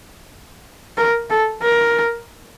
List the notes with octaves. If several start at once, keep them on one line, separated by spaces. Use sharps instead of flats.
A#4
A4
A#4